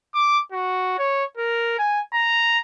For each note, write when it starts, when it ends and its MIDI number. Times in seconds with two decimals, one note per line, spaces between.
0.14 0.39 86
0.52 0.94 66
0.98 1.24 73
1.37 1.75 70
1.79 2.00 80
2.14 2.58 82